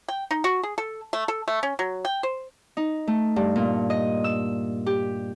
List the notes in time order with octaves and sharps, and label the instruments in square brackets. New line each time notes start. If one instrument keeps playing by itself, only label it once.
[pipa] G5
D#4
F#4
G#4
A4
A3
A4
A3
C#4
F#3
G5
C5
[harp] D#4
A3
G2
A#2
D#5
E6
G4